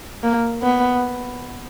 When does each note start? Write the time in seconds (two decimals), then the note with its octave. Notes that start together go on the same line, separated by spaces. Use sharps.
0.23 A#3
0.63 B3